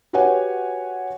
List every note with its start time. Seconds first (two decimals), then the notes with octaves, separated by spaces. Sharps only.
0.13 F#4 G4 B4 C#5 F#5 G#5